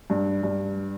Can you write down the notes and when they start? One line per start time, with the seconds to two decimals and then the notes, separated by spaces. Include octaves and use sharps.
0.10 G2
0.43 G2